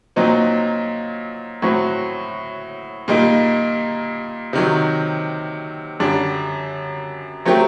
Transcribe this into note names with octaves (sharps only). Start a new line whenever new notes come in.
A#2 F#3 C4 D#4
A2 F#3 C4 F#4
A#2 G3 A#3 D#4
C3 D#3 F#3
F#2 D3 G3 D4
F#3 A3 C4 G4 A#4